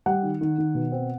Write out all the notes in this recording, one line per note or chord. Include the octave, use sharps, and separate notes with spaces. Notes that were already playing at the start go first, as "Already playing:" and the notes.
G3 F#5
D#3
D#3
D#3
B2
C4